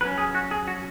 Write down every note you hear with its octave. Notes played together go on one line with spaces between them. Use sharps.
F#3 C#4 B4
G#4
F#4
G#4
F#4